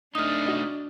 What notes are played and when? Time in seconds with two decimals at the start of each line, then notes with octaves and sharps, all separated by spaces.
0.15 A3 D4 D#4 D#6 F6
0.46 F#4 D#5